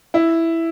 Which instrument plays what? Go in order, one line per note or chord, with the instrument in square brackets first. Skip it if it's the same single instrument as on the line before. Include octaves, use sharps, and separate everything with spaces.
[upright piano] E4